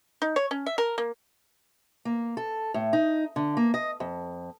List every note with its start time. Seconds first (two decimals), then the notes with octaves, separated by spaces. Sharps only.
0.22 D#4
0.36 C#5
0.51 C#4
0.66 E5
0.78 A#4
0.98 A#3
2.05 A#3
2.37 A4
2.74 A2
2.93 D#4
3.36 D3
3.57 A#3
3.74 D#5
4.00 F2